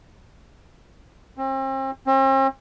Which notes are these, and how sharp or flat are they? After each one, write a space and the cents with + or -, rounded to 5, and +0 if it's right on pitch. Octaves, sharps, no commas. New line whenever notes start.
C4 +40
C4 +45